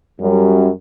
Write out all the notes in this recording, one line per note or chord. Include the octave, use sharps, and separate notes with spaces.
F#2 G3